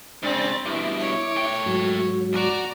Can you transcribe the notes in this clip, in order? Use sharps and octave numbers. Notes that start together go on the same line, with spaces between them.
G#2 C#3 C4 D4 B5 A6
G2 B2 E4 D6
C#5
A3 G5
G#2 F#3
B1 F#4 D5 A#5